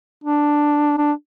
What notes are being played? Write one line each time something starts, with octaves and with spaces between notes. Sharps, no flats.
D4
D4